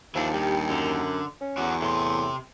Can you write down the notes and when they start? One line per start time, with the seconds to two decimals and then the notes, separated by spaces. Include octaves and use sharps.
0.15 D#2 E3 F3 D4
0.34 G2 G4
0.69 F#2 D3
1.40 C#4
1.57 E2 F#4 D5
1.82 A2 C3 C6